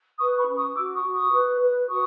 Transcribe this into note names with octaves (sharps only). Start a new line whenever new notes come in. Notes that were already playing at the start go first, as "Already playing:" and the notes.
B4 C#6 D#6
B5 C#6
C#4
C#6 D#6
F#4 D6 E6
C#6 D#6
F#4
C#6 D#6
B4
B4
F#4 C#6 D#6